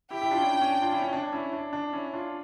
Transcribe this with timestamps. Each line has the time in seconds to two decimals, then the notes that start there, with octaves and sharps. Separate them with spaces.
0.11 E4 G4 G5
0.21 E4 G4
0.31 D4 F4
0.41 C#4 E4
0.51 D4
0.61 C#4
0.71 D4
0.82 D4 F4
0.92 C#4 E4
1.02 C#4
1.13 D4
1.23 D4
1.32 C#4 E4
1.53 D4
1.73 D4
1.93 C#4 E4
2.13 D4 F4